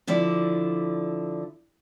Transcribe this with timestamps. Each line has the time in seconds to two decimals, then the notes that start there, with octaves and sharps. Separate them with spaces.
0.07 D3 F3 E4 D5